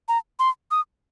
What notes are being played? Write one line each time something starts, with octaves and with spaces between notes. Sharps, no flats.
A#5
C6
D#6